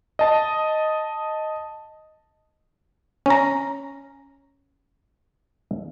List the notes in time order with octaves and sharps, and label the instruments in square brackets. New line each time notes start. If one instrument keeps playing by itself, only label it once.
[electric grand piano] D#5 A5
[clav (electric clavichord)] C#4 A#5